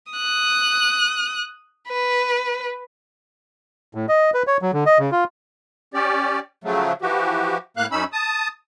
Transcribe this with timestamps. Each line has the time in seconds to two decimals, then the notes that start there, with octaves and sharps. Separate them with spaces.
0.12 D#6 F#6
1.89 B4
3.95 A2
4.09 D#5
4.34 B4
4.47 C#5
4.62 F#3
4.73 D3
4.86 D#5
4.99 C#3
5.12 F4
5.94 C#4 G4 D5
6.64 C#3 F3 F#3 A3
7.02 E3 F3 F#4 G4
7.77 A2 A#3 F5 F#6
7.91 F#2 C#4 D#4 B5 E6
8.13 A5 D#6